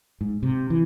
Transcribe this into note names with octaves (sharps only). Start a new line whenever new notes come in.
G#2
C3
E3